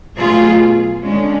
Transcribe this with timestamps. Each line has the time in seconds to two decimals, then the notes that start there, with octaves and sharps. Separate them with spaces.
0.18 B2 F#3 A3 F4 G#4
1.04 D3 G#3 C#4